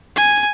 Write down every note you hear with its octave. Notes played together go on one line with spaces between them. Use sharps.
G#5